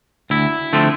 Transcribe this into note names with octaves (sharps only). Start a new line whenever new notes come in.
D2 E4
D3 F3 A3 C4